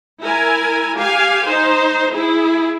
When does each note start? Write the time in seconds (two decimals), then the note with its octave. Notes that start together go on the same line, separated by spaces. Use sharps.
0.22 E4 A#4 G#5
0.97 G4 F5 G#5
1.45 D#4 C5
2.14 E4 G#4